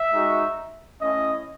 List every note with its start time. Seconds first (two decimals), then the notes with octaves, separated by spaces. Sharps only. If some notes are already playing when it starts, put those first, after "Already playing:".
Already playing: E5
0.12 G#3 D#4 F#4
1.02 A3 C#4 E4 D#5